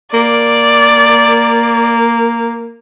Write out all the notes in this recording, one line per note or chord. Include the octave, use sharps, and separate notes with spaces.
A#3 D5